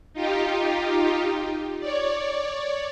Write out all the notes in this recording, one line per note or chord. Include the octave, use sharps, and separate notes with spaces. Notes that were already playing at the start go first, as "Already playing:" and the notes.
D#4 F4 G4
C#5 D5